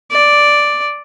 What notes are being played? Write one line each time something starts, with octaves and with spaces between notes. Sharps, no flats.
D5